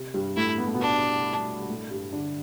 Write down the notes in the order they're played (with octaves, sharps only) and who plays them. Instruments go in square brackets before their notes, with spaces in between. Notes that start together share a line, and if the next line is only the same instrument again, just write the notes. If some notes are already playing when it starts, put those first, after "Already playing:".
Already playing: [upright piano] C3
G2 G3
[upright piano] A2 A3 [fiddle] E4
[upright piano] B3
A3
B2 B3
[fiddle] D4
[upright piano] G3
A2 A3
G2 G3
D3 D4